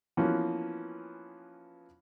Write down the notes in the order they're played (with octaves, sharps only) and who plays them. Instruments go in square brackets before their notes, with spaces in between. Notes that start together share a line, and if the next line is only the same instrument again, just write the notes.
[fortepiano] E3 F3 A#3 B3 C#4 F#4